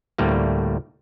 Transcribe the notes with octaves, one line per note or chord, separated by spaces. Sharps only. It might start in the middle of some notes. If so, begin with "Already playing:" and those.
D2 A2 G3 A3 A#3